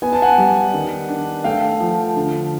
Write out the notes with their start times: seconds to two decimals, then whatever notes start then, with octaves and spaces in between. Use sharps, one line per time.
0.02 B3 G#5
0.13 A5
0.22 F#5 G#5
0.38 G3
0.74 D#3
1.09 D4
1.44 A3 F5 G5
1.80 F3
2.16 D3